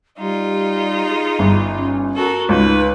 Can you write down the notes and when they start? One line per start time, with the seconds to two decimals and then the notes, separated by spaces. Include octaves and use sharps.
0.18 G3 D#4 F4
1.08 G#4
1.39 G1
1.76 C#4
2.15 F#4 A4 A#4
2.49 C#2 D#4 B4